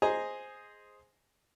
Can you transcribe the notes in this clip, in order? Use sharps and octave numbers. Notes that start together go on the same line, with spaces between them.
G#4 C5 D#5 G#5 A#5